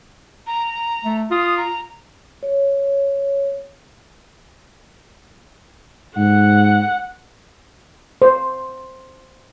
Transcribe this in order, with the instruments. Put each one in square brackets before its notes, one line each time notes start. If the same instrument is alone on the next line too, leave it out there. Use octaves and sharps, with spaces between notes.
[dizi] A#5
[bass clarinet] A3
[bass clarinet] F4 [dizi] D#6
[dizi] A#5
[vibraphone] C#5
[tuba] G#2 [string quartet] F#5
[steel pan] C5